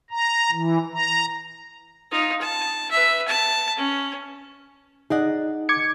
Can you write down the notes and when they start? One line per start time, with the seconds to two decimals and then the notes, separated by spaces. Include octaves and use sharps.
0.10 A#5
0.51 E3
0.93 A#5
2.11 D#4 F4
2.41 A5
2.91 B4 E5
3.28 A5
3.77 C#4
5.10 D#4 G#4 D5 D#5 F#5
5.69 D6 G#6 C#7